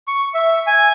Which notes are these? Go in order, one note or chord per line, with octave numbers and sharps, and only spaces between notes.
C#6
E5
G#5